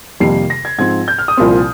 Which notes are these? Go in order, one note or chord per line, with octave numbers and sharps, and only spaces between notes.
F2 C3 D#3 G3 A#3 C7
A#6
G#6
G#2 F3 C4 G#6
G6
F6
D#6
C2 A#2 F3 C4